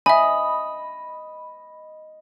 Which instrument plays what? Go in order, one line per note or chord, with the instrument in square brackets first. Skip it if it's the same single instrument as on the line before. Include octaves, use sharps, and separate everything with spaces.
[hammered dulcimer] D#5 [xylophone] E5 G#5 [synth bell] B5